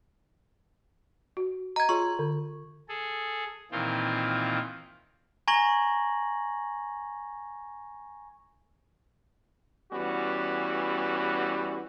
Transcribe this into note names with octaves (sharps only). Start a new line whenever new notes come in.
F#4
D#5 A#5 G#6
F4 G#4 C#5 C#6
D3
G#4 A4
A#2 D#3 E3 C4 F4
G#5 A#5 C#6 G#6 A#6 F#7
E3 G3 B3 C#4 F#4